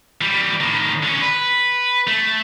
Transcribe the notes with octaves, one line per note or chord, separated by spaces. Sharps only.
E3 G3
A2 D#3
D3 C#4
B4
A3